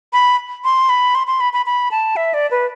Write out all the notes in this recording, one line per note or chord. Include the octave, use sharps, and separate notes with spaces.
B5
C6
B5
C6
C6
B5
B5
B5
A5
E5
D5
B4